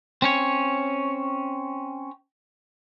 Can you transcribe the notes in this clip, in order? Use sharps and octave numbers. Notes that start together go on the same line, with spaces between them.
C4 C#4 C#5